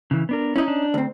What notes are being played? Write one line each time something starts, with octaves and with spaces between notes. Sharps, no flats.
C#3 E3
B3 D4 A#4
C#4 D#4 E4
D4
D2 C4